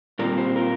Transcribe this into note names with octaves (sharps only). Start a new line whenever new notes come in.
A#2 G3 C4 F4 A#4 D5
G4 C5
F4 A#4